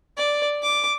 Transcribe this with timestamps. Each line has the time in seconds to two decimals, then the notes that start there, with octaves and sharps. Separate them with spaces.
0.17 D5
0.63 D6